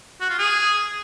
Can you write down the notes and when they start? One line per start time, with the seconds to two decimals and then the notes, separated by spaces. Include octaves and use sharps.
0.21 F#4
0.30 F4
0.39 G#4